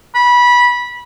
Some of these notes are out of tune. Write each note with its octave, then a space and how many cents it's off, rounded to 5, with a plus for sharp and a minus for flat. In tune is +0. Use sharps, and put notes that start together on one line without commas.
B5 -20